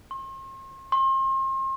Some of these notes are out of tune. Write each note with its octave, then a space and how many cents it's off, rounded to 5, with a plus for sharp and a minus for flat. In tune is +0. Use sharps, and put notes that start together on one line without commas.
C6 +45
C6 +40